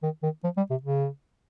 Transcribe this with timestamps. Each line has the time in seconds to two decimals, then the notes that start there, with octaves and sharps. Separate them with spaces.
0.03 D#3
0.23 D#3
0.44 F3
0.57 G3
0.70 C3
0.83 C#3